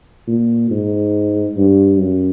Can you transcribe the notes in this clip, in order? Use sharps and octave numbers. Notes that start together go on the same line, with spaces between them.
A#2
G#2
G2
F#2